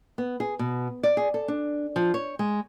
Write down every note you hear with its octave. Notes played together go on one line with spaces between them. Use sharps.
B3
G#4
B2
D5
G#4
A4
D4
F3
C#5
G#3